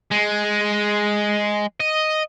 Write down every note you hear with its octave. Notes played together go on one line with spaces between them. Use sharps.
G#3
D#5